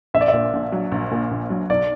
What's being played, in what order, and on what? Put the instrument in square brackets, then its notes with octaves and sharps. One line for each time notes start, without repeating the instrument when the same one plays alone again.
[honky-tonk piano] A#1 [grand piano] E5
[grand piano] D5
E5
[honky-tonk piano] A#2
A#1
F#3
A#1
A#2
A#1
F#3
[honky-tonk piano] B1 [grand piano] D5